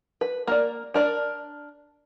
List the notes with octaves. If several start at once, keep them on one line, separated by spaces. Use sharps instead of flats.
B4
A#3 A#4 D5
D4 A#4 D5